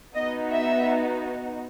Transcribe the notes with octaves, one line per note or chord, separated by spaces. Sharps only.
B3 D#4 F#4 D#5
E5